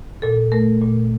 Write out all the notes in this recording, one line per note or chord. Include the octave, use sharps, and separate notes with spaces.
A#2 A4
A3 A#4
A#2